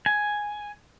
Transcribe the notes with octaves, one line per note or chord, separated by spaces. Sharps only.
G#5